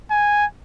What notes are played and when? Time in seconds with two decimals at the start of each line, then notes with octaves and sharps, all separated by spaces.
0.11 G#5